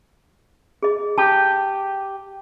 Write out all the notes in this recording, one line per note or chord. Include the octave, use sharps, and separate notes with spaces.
G#4 D#5
G4 A5